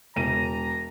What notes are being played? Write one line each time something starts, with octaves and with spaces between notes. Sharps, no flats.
E1 A#5 D#7